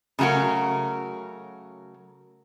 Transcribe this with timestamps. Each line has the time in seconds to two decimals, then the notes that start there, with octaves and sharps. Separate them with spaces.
0.19 C#3 F#3 A3 F#4 A#4